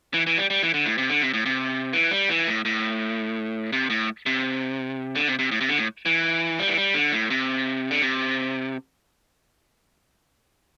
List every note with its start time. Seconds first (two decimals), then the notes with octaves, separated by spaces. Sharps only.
0.14 E3
0.27 E3
0.38 G3
0.50 G3
0.63 E3
0.74 D3
0.86 A2
0.98 C3
1.10 D3
1.22 C3
1.34 A2
1.46 C3
1.93 E3
2.11 G3
2.30 E3
2.47 A2
2.65 A2
3.73 C3
3.90 A2
4.26 C3
5.15 D3
5.28 C3
5.39 C3
5.52 A2
5.61 C3
5.69 D3
5.78 A2
6.06 E3
6.59 G3
6.68 E3
6.77 G3
6.94 D3
7.12 A2
7.30 C3
7.91 D3
8.02 C3